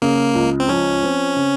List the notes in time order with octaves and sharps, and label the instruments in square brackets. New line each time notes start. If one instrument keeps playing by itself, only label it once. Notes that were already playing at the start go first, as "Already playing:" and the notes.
[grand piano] C#3 [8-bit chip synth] A#3
[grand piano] C#2
[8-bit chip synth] C4
[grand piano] F3 [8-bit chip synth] C#4
[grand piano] C4
C#3